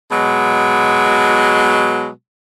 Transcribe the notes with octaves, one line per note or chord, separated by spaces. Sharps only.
B2 F#3 G#3